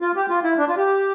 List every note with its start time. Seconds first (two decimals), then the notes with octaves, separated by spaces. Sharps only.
0.01 F4
0.16 G4
0.30 F4
0.44 E4
0.58 D4
0.68 F4
0.77 G4